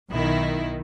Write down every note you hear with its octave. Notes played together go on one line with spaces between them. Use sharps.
B1 D#3 E4